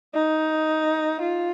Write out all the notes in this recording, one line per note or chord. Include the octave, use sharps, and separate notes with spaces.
D#4
F4